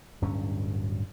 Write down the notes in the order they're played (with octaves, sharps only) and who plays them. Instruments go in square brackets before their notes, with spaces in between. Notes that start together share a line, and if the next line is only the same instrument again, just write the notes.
[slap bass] D1 G2 C#4